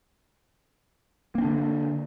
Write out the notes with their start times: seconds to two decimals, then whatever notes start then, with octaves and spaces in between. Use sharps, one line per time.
1.35 A#3
1.38 C4
1.41 D4
1.45 D3